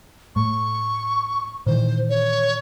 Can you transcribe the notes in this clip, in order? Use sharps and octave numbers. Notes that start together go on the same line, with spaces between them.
A2 A3 C#6
A#2 D#3 E3 C5
C#5